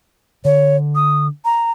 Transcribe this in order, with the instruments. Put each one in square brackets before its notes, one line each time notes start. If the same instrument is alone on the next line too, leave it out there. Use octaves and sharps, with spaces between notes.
[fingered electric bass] D3 [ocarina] C#5
[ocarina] D#6
A#5